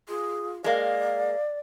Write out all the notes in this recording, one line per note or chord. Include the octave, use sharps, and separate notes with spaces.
F4 G#4
G#3 A#3 D5 F5